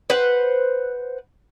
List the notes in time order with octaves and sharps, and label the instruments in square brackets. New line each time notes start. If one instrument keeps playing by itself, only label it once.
[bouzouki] B4 C5 F#5